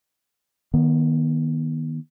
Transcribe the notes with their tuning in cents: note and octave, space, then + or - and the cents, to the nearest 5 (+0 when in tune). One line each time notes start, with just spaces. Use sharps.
D#3 +0 B3 -35